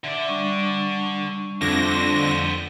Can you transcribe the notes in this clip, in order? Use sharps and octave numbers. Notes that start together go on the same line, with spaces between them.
D3 D5 E5
G3 D4 C#6
F2 D3 F3 E4 A#6
B3 C5